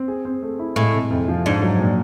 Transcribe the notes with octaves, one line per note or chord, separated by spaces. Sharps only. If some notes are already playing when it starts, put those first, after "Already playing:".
Already playing: C4
G#4
C4
A3
E4
A2 G#3
C3
F2
F3
G#2 D4
F#3
A#2